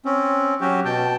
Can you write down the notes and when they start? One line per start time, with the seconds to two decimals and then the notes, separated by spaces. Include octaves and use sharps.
0.05 C4 C#4
0.61 F#3 C#4 F#4 G4
0.85 B2 G5 A5